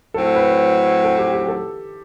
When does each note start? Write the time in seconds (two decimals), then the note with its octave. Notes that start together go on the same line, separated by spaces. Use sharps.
0.14 A2 F#3 C4 A4
0.36 B4
1.04 A4
1.19 G4
1.34 G4
1.48 A4